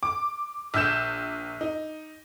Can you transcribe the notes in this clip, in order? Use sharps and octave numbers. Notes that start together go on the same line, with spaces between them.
D6
A#1 E6 G6 E7
D#4